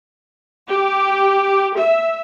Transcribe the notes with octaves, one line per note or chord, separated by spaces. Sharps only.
G4
E5